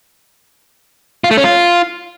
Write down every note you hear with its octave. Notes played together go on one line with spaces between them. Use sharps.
F4
A3
C#4
F4